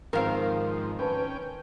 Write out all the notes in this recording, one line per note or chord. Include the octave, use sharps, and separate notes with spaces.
G#2 D#3 F3 C4 A#4 F5
C#4 B4 G5 A5